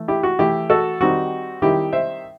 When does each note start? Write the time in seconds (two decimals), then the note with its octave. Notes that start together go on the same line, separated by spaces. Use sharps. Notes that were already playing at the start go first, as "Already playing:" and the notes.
Already playing: E3 A3
0.08 E4 G4
0.23 F#4
0.39 E3 A3 E4 G4
0.70 F#4 A4
1.00 D#3 G3 C4 D#4 F#4
1.62 D#3 G3 C4 D#4 E4 G4
1.93 C5 E5